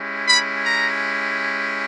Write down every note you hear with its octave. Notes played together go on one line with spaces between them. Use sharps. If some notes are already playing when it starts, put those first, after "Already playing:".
Already playing: G#3 C#4 E4 G4
B5
A#5